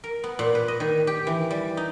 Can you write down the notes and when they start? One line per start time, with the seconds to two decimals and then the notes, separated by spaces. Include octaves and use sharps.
0.04 A#4
0.24 B3
0.39 A#2
0.55 B4
0.68 D#5
0.80 D#3
1.07 G4
1.27 E3
1.50 G3
1.77 D#4